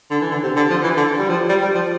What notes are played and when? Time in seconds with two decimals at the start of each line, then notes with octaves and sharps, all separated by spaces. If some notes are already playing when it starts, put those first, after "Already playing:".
0.11 D3
0.21 E3
0.31 D3
0.43 C3
0.56 D3
0.70 F3
0.83 E3
0.96 D3
1.18 G3
1.29 F3
1.49 G3
1.61 G3
1.75 F3